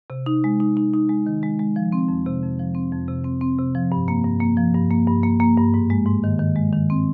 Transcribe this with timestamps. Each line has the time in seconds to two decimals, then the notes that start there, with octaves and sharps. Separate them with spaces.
0.10 C3
0.26 D#4
0.44 G#3
0.60 D#4
0.77 D#4
0.93 D#4
1.09 G#3
1.27 D#3
1.43 G#3
1.60 G#3
1.76 F3
1.92 C4
2.08 F2
2.26 C3
2.43 F2
2.59 F3
2.75 C4
2.92 F2
3.08 C3
3.24 C4
3.41 C4
3.58 C3
3.75 F3
3.92 G2
4.08 A#3
4.25 G2
4.41 A#3
4.57 F3
4.74 G2
4.91 A#3
5.08 G2
5.23 A#3
5.40 A#3
5.57 G2
5.74 G#2
5.90 G#3
6.06 G#2
6.24 D#3
6.39 D#3
6.56 G#3
6.73 D#3
6.90 C4